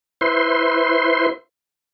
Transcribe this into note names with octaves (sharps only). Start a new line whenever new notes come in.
E4 B4 C5 C6